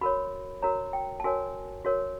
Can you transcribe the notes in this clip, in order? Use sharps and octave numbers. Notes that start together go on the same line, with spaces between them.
F#4 A#4 C#5 B5
F#4 A#4 C#5 A#5
G5
A5
F#4 A#4 C#5 G#5
F#4 A#4 C#5